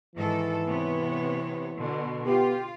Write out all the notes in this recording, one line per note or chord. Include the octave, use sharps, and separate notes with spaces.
G#2 D#3 E3 A4
C3 B3 C#5
B2 D3
B3 F4 G4